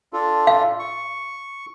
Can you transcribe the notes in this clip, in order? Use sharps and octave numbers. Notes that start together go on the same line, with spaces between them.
D4 F4 A4
F5
C#6